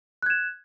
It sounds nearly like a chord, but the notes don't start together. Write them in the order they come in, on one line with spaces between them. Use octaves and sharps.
F#6 G#6 E7